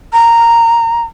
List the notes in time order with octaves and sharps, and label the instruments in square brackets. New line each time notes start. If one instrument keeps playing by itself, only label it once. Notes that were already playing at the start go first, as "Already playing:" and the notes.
[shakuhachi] A#5